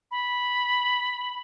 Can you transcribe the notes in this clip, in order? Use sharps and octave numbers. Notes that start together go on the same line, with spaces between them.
B5